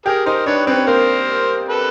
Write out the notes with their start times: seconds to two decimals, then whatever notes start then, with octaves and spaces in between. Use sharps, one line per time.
0.06 G4 G#4 A#4
0.26 D#4 A#4 C5
0.46 D4 B4 C#5
0.66 C4 B4 C#5
0.87 A#3 A#4 C5
1.68 A4 B4